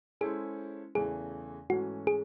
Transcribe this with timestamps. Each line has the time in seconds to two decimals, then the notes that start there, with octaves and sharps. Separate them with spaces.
0.21 G#3 C#4 E4 G#4 A4 C5
0.95 E2 C#3 E3 A3 G#4
1.69 G#2 E3 A3 C#4 F#4
2.07 G#4